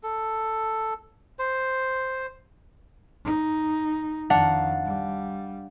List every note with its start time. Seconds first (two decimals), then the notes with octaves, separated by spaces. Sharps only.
0.03 A4
1.39 C5
3.25 D#4
4.30 F2 D#3 D4 F5 F#5
4.85 G3